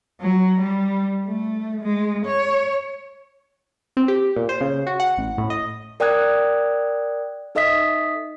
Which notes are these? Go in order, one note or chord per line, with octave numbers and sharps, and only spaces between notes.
F#3
G3
A3
G#3
C#5
C4
G4
A#2
C5
C#3
F#4
F#5
A1
A2
D#5
A#4 D5 G5 D#6 F#6 G#6
D#4 A4 D#5 E5 D#6 B6